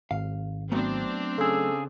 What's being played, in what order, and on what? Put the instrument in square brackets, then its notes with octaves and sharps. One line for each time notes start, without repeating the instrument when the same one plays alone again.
[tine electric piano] G#1 [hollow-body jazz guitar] F5
[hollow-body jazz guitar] F#3 A3 B3 [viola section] C4 D4
[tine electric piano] C#3 G#4 [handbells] A4 E6